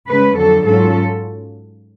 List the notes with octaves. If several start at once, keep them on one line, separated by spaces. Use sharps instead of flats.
C#3 G#3 C#4 B4
F2 D3 F#3 A4
G#2 F#3 C#4 F4 A4